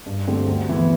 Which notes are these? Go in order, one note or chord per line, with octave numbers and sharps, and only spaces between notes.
G2
D3 A3 C4 G4
D2
C3 E3 B3